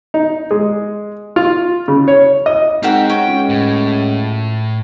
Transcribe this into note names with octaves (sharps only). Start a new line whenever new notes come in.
D#4
G#3
F4
C#3
C#5
D#5
G#2 C4 F#4 G4 A#4
C#4 F#4 G5
C#2
A2